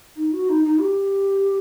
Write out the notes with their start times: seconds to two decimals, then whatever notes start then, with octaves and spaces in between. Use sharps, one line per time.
0.16 D#4
0.32 F#4
0.48 D#4
0.65 D#4
0.80 G4